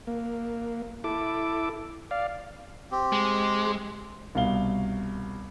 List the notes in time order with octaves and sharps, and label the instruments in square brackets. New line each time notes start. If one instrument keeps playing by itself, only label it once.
[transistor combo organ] A#3
E4 A4 D6
D5 F5
[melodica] C4 G4
[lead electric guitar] G#3
[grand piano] C2 B2 F5 G7